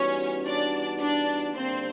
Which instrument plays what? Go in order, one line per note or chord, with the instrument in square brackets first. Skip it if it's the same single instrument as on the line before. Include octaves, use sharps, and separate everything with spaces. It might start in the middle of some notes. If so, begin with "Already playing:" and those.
Already playing: [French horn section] E3 G3 B3 D#4 F#4 [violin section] C#4 C#5
[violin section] D4 D5
D4 D5
[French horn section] D#2 D3 G3 A#3 D4 [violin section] C4 C5